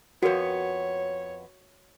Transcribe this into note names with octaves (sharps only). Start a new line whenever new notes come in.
F2 B3 F#4 A#4 C#5